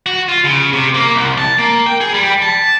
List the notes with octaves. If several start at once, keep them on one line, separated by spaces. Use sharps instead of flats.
F#4
F4
C#3
C3
A#3
C2
A5
A#3
G5
G#4
G3
A5